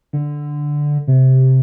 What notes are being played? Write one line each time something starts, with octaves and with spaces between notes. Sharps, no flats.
D3
C3